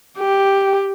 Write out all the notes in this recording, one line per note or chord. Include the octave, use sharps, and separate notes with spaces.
G4